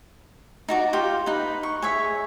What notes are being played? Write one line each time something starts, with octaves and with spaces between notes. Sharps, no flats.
D#4 F#4 D5
F4 G4
D#4 B4
C#6
G#4 C#5 E5